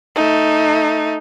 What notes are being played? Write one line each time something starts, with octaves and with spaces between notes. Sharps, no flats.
A3 D#4